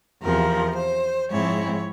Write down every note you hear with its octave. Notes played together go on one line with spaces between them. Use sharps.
E2 C3 F3 A#4
C5
G#2 F3 G#3 C4 E4 C#5